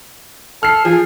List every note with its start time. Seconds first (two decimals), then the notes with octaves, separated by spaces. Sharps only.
0.63 A4 F6 C7
0.85 F3 G#4